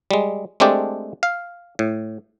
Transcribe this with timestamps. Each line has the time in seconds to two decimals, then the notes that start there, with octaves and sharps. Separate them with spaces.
0.11 G3 G#3
0.60 G#3 A3 C4 D4 G4 D5
1.23 F5
1.79 A2